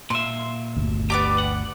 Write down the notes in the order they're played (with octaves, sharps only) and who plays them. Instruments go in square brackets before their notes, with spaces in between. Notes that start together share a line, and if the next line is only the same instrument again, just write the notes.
[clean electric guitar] A#2 E5 [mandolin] C6
[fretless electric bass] G1 D2
[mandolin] B3 D5 D6 [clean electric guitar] G4
[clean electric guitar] F#5